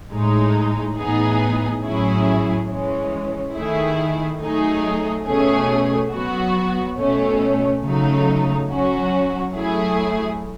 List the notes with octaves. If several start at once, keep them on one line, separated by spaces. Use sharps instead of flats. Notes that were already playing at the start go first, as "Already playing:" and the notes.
A2 G#3 D#4
A2 E3 B3 D#4 G#4
A2 F#3 C#4 E4 G#4
E3 G#3 C#4
D#3 A3 E4 G#4
F#3 A3 D#4 G#4
B2 A3 C#4 G#4
F#3 B3 F#4
B2 A3 C#4
C#3 F#3 A3 D#4
F#3 C#4 F#4
F#3 A3 E4 G#4